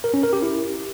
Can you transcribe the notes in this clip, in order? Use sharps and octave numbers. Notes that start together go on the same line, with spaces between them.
A#4
C#4
A#4
G4
E4